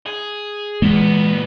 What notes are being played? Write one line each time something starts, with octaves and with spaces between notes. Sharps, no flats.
G#4
A#2 E3 G#3 A#3 B3